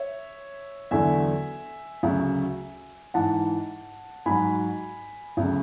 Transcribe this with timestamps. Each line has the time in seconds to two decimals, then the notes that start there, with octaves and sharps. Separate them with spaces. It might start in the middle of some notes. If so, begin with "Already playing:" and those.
Already playing: C#5 E5
0.91 E2 D3 F#3 E5 G#5
2.03 D2 C#3 F#3
3.14 G#2 E3 F#5 A5
4.26 G#2 F#3 G#5 B5
5.37 D2 C#3 F#3